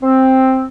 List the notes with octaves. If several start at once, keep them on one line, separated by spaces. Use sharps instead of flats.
C4